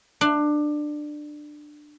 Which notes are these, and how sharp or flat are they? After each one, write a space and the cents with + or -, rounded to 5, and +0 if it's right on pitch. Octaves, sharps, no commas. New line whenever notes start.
D4 +20